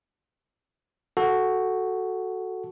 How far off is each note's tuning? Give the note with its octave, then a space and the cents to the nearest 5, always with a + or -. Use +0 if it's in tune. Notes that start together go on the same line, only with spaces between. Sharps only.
F#4 +0 A4 -5